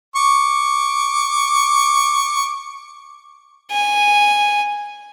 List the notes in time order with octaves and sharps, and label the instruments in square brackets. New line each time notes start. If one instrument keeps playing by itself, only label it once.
[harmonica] C#6 D6
[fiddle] G#5